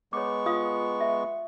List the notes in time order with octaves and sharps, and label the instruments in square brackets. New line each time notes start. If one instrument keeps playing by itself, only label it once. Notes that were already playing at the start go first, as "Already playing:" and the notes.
[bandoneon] G#3 B3 C#6 [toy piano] C#5 D6
[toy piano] F4 F5 D#6
E5